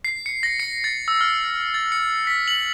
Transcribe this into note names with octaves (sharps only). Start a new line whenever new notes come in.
C7
C#7
A#6
C#7
A6
E6
F6
A6
C#7
B6
F#7